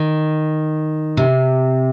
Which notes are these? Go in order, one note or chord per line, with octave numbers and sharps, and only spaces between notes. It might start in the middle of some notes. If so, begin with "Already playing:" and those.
Already playing: D#3
C3